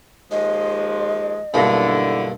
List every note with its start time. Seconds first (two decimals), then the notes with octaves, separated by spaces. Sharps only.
0.31 D#2 F3 G#3 D#5
1.54 B1 G2 D3 A#3 E4